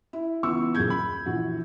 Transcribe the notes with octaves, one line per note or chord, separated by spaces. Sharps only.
E4
C#2 E3 B3 C#6 E6
D#1 F#2 C#3 G#4 G6 G#6
B5
A#1 E3 F#4